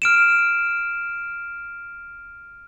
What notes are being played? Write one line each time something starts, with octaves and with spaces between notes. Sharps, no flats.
F6 D7 E7